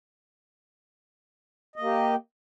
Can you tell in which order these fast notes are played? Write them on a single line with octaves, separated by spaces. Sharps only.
D#5 A#3 G4